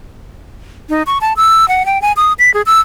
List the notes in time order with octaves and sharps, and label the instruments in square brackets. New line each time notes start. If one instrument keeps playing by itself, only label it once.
[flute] D#4
C#6
A5
E6
F#5
G5
G#5
D#6
B6
G#4
E6